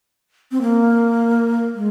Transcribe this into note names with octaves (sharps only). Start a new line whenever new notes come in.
C4
A#3
G#3